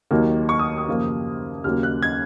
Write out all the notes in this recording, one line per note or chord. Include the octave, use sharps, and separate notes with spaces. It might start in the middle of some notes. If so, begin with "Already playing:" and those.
D#2 D#3 F#3 A#3
C#6
D#6
D#6
F#2 C#3 F3 A#3
D#2 C#3 F#3 A#3 F6
F#6
G#6